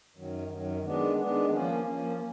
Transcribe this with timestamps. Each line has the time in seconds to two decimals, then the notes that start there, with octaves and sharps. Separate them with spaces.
0.15 F#2 D#3 F#3
0.50 F#2 D#3 F#3
0.84 D#3 G#3 B3 D4
1.18 D#3 G#3 B3 D4
1.52 F3 A#3 C#4
1.86 F3 A#3 C#4